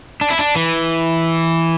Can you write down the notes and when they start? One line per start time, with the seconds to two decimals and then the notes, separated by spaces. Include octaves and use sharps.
0.21 D4
0.30 E4
0.39 D4
0.56 E3